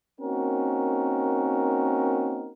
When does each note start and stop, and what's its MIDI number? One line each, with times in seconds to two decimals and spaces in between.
0.20 2.51 58
0.20 2.51 60
0.20 2.51 61
0.20 2.51 63
0.20 2.51 66
0.20 2.51 70